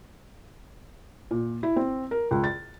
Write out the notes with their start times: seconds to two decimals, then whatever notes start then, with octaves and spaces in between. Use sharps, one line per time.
1.31 A#2
1.63 E4
1.76 C4
2.11 A#4
2.31 C#2
2.44 A6